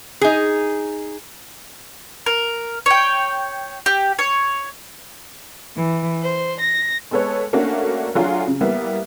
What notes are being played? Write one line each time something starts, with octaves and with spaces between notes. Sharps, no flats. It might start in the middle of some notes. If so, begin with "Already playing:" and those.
D#4 G#4
A#4
C#5 G5
G4
C#5
E3
C5
A#6
G#3 B3 A4 B4 C#5
A3 A#3 C#4 D4 F#4
F#3 A3 D4 F4 F#4 G#4
C#3
G3 A#3 B3 E4